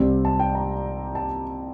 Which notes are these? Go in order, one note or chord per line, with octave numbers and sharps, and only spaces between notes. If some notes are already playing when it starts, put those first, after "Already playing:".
Already playing: C2 C3 G3 C4
A5
G5
A#5
A5